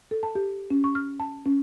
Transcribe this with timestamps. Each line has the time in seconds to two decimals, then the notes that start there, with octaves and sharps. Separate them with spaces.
0.11 A4
0.23 A5
0.35 G4
0.70 C#4
0.84 C#6
0.95 F6
1.20 A5
1.46 C#4